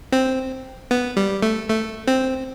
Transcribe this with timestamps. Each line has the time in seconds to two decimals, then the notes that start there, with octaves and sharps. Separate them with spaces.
0.12 C4
0.91 B3
1.17 G3
1.42 A3
1.69 A3
2.08 C4